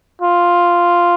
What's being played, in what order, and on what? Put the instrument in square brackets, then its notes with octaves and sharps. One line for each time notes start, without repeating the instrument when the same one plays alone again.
[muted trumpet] F4